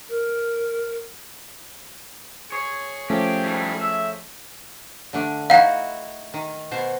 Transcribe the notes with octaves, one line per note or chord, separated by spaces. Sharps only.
A#4
G#4 C#5
F3 A3 C#4 G4
A2 G3
E5
D3 A3 D4
D#4 E4 F#4 F5 F#5
D#3
B2 C5